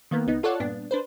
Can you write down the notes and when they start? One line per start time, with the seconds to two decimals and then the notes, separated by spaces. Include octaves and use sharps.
0.11 D#3 A#3 B3
0.27 C#2 B3 D#4
0.43 F4 A4 C#5 D5 F#5
0.60 G2 A#2 B3 D4
0.91 D4 B4 C5